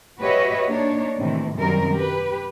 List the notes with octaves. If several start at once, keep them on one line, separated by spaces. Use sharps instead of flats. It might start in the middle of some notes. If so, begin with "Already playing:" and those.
F#4 G4 B4 C#5 D#5 E5
A#3 D4 D#4 C#5
A2 C3 D#3 E3
F#2 C3 D#3 G3 A#4
G4 B4